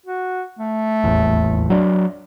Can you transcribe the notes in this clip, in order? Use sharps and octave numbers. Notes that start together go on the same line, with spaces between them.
F#4
A3
D#1 A1 E2
F#3 D4